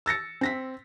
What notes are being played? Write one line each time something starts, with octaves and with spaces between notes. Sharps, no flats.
E6 A6 A#6 C#7
C4 A#6 B6